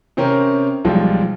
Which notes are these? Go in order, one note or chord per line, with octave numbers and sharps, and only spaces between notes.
C3 C4 C#4 A#4
B1 F3 G3 G#3